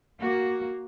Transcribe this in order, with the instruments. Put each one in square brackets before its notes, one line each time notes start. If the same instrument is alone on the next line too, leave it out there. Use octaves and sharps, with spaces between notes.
[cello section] A#3 F#4